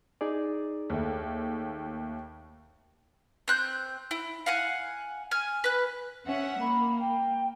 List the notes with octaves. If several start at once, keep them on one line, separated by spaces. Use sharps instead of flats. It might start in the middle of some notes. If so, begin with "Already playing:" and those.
D#4 G#4 D5
D#2 A3
C4 F#6 G6
E4
F5 F#5 G#5
G#5 F6
B4 F#6
C#4 E5 F#5
A#3 B5
G5